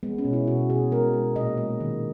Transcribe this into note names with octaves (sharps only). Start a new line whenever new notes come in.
G#3 B3
C#4
B2
E4
B2 F#4
B2 G#4
G#3 A#4
G#3
A#2 D#5
G#3
D#3